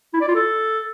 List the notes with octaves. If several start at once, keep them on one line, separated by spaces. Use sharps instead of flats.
E4
D5
F4
A4